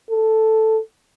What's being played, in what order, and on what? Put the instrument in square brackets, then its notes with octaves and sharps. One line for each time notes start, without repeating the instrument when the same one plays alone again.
[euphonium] A4